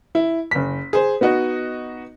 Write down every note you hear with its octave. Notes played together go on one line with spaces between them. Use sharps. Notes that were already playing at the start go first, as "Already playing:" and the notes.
E4
F#1 B6
G#4 C5
B3 D#4 F#4 D#5